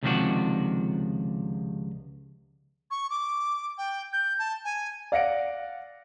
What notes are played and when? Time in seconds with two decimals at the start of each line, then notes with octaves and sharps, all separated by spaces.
0.03 C#2 C3 D#3 F3 D4 F#4
2.91 C#6
3.10 D6
3.78 G5
4.13 G6
4.39 A5
4.65 G#5
5.12 D5 F5 F#5 A#6 C#7 D7